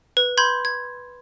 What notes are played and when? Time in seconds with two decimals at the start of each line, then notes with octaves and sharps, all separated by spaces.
0.17 B4
0.37 B5 C6 G6 G#6
0.65 G#6